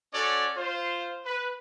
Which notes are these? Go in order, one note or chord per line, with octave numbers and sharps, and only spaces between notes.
C#4 F#4 A4 C#5 D5
F4 C5
B4